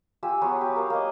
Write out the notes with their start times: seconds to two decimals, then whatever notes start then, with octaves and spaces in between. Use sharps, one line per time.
0.23 F4 G4 G#5 E6
0.42 F#3 B3 G#4 C#5
0.61 G4
0.76 A#4 F5
0.90 A#3 D#5